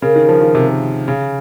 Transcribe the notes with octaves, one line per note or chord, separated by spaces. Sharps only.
C#3 A#4
D#3
F3
D#3
C3
C#3